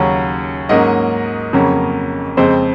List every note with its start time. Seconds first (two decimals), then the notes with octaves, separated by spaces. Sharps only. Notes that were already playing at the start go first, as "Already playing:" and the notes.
Already playing: D#2 C#3 F#3 C#4
0.69 G#2 F#3 A#3 C#4 D#5
1.53 F2 C#3 F#3 A#3 C#4
2.37 F2 C#3 G#3 C4 C5